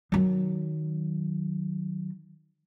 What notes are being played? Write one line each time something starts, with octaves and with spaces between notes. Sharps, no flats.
D#3 F#3